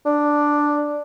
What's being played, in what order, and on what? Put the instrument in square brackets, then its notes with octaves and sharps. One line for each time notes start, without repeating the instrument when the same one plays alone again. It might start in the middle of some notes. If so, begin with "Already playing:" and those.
[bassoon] D4